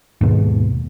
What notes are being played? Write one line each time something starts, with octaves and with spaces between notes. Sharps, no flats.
D#2 G#2 B2